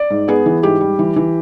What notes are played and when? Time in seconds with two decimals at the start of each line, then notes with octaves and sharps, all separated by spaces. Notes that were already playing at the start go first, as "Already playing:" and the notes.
Already playing: D5
0.10 G#2
0.28 B3 G#4
0.46 E3
0.63 G#2 G4
0.81 G3
0.99 E3
1.16 E3